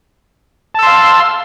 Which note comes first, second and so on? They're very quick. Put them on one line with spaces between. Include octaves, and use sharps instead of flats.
A5 E6 C6 F5